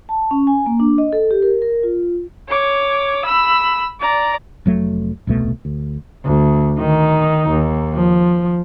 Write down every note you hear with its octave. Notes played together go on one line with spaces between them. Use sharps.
A5
C#4
G#5
A#3
D4
D#5
A4
G4
A#4
A#4
F4
C#5 D6
B5 E6
D5 A#5
F1 F#3 A3
D#1 C2 B2 A3
D2
D2
D#3 D#4
D#2
F3